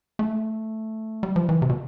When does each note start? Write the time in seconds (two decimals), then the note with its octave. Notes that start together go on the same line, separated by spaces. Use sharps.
0.19 A3
1.23 G3
1.36 F3
1.49 E3
1.62 C3
1.69 B2